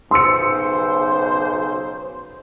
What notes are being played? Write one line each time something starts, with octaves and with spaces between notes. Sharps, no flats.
B1 C#3 C5 C6 E6 C#7